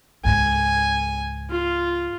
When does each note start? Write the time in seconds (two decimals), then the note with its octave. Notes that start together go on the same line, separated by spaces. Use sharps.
0.25 C#2 G#2 G#5
1.50 F4